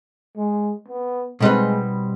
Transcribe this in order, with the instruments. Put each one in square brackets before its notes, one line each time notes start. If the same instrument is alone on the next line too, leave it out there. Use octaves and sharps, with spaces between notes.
[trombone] G#3
B3
[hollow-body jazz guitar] B2 G3 C4 D#4 B4 [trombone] G#3